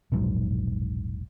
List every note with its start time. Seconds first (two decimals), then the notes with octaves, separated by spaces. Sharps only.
0.12 E1 A#1 G#2 F#3